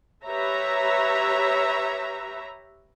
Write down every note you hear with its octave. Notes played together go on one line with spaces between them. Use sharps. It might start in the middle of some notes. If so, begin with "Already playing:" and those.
G4 B4 C#5 E5 A#5